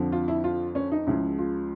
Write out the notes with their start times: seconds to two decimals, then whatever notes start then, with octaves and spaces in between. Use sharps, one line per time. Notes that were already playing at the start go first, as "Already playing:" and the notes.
Already playing: F2 D3 F3
0.12 F4
0.28 E4
0.44 F4
0.75 C#4
0.92 D#4
1.07 C#2 C#3 F3 E4
1.38 F4